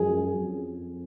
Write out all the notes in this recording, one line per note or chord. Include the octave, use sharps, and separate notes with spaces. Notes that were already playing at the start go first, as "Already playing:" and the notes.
Already playing: F#2 F3 G#3 G#4
F2